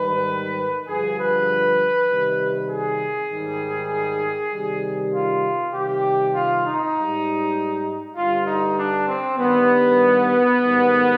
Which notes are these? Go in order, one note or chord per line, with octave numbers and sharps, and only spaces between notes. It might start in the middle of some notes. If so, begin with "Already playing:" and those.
Already playing: G#2 D#3 G3 B4
G2 D3 F3 G#4
B4
C3 D#3 G3
G#4
G#2 D#3 G3
C3 D#3 G3
F4
C3 D#3 G3 G4
F4
D#4
G#2 G3
G2 D3 G3 F4
D#4
D4
C4
G2 D#3 G3 B3
G#2 D#3 G3